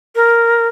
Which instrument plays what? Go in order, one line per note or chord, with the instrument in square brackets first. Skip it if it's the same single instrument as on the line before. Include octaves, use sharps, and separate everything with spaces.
[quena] A#4